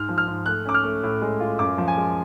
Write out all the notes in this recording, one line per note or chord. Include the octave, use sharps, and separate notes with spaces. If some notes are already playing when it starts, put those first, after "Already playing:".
Already playing: G#2 F6
F3
F6
G#2
A3 F#6
C#4 D6
F6
A3
A2
G#3
F4
F#2 D6
F3
G#5
G#3